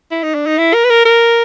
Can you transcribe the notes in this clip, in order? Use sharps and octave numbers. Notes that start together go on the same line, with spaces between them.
E4
D#4
D4
D#4
E4
A#4
B4
A#4
A#4